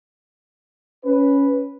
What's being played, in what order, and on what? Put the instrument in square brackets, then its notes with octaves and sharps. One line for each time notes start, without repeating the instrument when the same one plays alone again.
[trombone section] C#4 B4